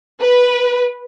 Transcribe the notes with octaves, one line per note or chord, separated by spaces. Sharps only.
B4